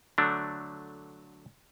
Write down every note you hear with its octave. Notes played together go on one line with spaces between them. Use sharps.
D3 F#3 A3 D4